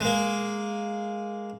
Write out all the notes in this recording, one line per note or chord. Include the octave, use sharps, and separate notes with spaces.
G#3 A#3